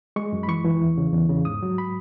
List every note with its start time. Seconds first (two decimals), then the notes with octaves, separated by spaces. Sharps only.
0.16 G#3 C#6
0.33 F#2
0.43 B5
0.48 E3 C#6
0.65 E3
0.81 E2
0.98 C#3
1.13 E2
1.29 C#3
1.45 G#2 D#6
1.62 F#3
1.78 B5